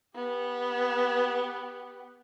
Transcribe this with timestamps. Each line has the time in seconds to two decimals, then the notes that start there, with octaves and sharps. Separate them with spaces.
0.15 B3 G4